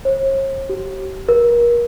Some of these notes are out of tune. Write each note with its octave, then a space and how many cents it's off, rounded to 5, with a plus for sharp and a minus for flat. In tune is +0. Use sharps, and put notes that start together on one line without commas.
C#5 -45
G4 -40
A#4 +30